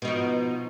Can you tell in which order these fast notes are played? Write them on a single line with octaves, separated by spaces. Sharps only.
B2 D#4 F3